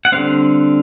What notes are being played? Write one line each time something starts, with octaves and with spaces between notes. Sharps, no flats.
F#5
D3 G3 C4 F5